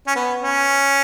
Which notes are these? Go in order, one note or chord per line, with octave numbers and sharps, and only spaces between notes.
C#4
B3
C#4